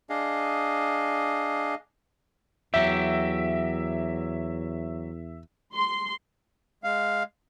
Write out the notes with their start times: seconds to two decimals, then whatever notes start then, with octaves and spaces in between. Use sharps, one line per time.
0.10 D4 G#4 D#5 F5
2.74 E2 F#3 G4 E5
5.73 C6
6.84 G#3 F5